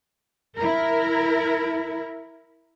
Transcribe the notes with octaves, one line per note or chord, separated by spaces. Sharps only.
E4 A#4